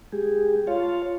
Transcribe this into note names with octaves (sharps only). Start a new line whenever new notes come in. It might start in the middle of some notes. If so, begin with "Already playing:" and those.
G#3 G4 G#4
F4 C#5 F5 A5